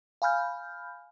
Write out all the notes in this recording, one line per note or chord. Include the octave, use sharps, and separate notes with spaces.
F5 G#5 B5 F6 G6